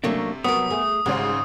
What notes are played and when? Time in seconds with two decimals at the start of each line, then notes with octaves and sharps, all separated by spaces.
0.04 C3 F#3 A3 A#3 C#4 D4
0.44 F#3 B3 A#4 B4 D#6
0.70 A3 G#4
1.06 G#1 G#2 C#3 G#3 F#4 G4 C5